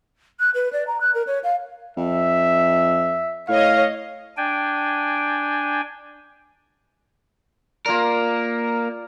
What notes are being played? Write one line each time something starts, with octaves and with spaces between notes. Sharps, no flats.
F#6
B4
D5
A#5
F#6
A#4
C#5
F5
F2 E5
A2 C#5 D#5 F5
D4 G5 G#5
A#3 F4 A#4 D5